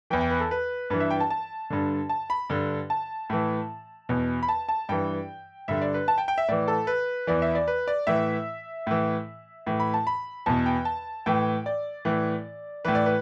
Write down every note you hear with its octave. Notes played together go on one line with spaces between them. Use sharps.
E2 E3 G5
G5
B4
A4
B4
G2 E3 B4
E5
G5
A5
A5
G2 D3
A5
B5
G2 D3
A5
A2 E3
E2 B2
B5
A5
A5
G2 E3 G5
G2 D3 E5
D5
B4
A5
G5
G5
E5
A2 E3 D5
A4
B4
E2 E3 D5
E5
D5
B4
D5
A2 E3 E5
A2 E3
A2 E3
B5
A5
B5
E2 B2 A5
G5
A5
A2 E3 G5
D5
A2 E3
A2 E3 B4
D5
B4